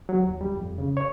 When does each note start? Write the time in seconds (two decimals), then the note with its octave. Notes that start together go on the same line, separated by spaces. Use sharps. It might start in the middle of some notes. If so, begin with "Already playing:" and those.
0.09 F#3
0.23 D#2
0.41 G3
0.56 F2
0.78 C#3
0.97 C#5